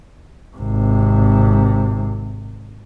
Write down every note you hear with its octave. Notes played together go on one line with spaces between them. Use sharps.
G#1 C3